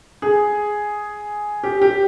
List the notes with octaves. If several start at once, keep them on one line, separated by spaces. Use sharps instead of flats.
G#4
G4
G4